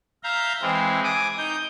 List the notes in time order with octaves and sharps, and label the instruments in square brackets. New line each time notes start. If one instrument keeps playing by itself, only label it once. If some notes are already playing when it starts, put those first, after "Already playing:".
[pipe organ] E5 F5 A#5 G6
E3 G#3 C4
G#5 D6 D#6
D#4 G6